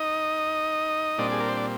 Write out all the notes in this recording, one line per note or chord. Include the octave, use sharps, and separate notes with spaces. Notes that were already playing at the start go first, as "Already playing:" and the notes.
Already playing: D#4 D#5
A#2 G3 C4 D4 D5
G#4
A#4
C5
D5